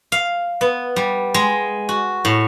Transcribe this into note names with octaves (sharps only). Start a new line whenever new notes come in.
F5
B3
G3
G#3
F#4
A2